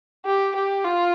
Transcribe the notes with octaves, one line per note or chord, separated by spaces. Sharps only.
G4
G4
F4